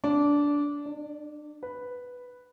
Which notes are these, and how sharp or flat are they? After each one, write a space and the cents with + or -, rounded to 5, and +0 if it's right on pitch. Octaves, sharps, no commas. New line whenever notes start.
D4 -15
D4 +35
B4 +0